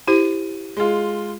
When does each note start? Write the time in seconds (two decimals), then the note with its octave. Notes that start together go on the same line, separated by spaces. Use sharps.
0.08 E4 G4 C5 D#7
0.77 G#3 F4